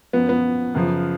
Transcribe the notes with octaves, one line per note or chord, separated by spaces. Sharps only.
F#2 F3 B3
B3
F#2 C#3 F3